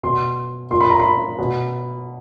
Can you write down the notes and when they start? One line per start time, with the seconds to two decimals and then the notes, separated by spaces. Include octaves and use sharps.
0.03 B2 C6
0.71 A#2 C6
0.81 B5
0.90 A#5
1.00 B5
1.39 B2